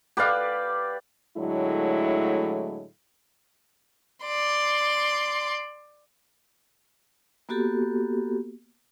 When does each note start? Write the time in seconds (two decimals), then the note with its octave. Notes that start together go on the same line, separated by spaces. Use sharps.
0.17 G4 B4 D5 F5
1.37 A2 D3 F#3 G#3 A3 E4
4.26 D5 C6
7.49 A#3 B3 F#4 G4 A4